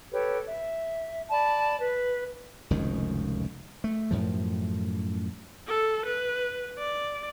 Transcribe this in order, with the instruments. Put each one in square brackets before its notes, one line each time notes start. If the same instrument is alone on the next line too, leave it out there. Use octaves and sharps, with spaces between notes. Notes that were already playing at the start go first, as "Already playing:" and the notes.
[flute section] G4 A4 B4 C#5
E5
D5 A5 B5
B4
[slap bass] F1 C#2 F#2 D#3
A3
F#2 A2 F3
[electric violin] A4
B4
D5